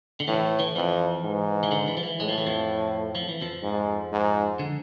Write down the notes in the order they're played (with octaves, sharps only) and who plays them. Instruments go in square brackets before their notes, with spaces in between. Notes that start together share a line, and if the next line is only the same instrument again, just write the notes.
[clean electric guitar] D3
[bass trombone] A2 [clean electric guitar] E3
[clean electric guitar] E3
[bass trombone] F2 [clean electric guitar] E3
[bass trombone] G#2
[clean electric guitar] E3
D3
E3
F3
E3
[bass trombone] A2 [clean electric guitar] G#3
[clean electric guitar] F3
E3
F2 F3
F3
E3
F2 F3
[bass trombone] G#2
G#2
[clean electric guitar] D3